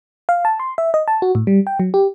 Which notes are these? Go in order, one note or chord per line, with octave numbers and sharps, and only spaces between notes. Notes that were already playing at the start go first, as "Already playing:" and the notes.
F5
A5
C6
E5
D#5
A5
F#4
A2
G3
G5
F#3
G4